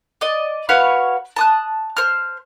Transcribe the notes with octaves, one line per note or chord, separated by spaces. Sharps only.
D5 D#5
F#4 B4 C#5 F5
A5 D#6 F#6
C5 F6